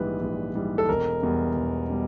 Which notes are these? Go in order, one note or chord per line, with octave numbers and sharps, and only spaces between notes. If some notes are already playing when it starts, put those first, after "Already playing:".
Already playing: A#1 G#2 E3 G3 B4
A#1
G#2 E3 G3
A4
E1 A#4
E2 B2 G3
E1
B2 G3